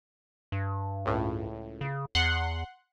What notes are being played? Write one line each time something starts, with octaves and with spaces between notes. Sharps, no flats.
G2
C#2 A2
C#3
E2 F#5 C6 F#6